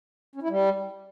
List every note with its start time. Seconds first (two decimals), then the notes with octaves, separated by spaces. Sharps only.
0.35 C#4
0.42 E4
0.49 G3